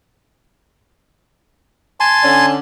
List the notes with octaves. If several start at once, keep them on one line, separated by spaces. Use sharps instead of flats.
G#5 A5 C6
D3 C#4 D5